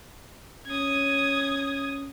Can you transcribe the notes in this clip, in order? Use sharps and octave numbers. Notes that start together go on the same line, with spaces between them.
C#4 D#6 G#6